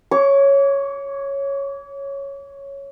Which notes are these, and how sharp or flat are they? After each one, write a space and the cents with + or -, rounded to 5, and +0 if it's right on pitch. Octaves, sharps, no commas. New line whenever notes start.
C#5 +0 D6 -40